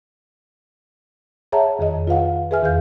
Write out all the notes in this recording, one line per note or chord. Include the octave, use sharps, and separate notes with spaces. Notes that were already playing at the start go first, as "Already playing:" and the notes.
G#4 C#5 E5 F#5 A5 A#5
F2 D#3 G#4 D#5
F4 B4 F5 F#5
G#4 B4 E5 G#5 F6
E2 D#3 G#4 F5 G6